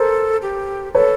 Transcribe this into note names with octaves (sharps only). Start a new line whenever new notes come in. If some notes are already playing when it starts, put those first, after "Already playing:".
Already playing: A4 A#4 C5
G4
A4 B4 C#5